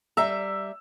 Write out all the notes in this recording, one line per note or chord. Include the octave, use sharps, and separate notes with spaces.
G3 E5 A#5 E6